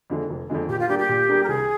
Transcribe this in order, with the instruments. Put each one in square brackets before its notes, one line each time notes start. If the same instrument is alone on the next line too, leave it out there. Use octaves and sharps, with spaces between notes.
[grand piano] F2 D3 G#3
F1
F2 D3 G#3
[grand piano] A#2 [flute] G4
[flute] F4
[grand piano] G3 A#3 D4 G#4 [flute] G4
[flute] G4
[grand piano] A#2
G3 A#3 D4 G#4
[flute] A#4
[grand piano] C2 [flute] G#4